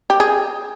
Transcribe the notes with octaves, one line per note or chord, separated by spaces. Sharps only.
G4
G#4